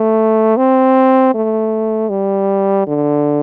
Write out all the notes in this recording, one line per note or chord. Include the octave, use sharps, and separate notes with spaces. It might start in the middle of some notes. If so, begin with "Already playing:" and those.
Already playing: A3
C4
A3
G3
D3